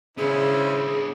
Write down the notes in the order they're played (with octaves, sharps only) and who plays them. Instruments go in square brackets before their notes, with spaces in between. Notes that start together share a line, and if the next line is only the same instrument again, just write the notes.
[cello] C#3 [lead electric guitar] B3 D4 [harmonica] E4 C5 [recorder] G#4